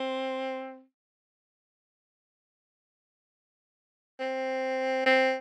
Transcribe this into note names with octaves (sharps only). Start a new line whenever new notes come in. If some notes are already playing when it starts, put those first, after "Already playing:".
Already playing: C4
C4
C4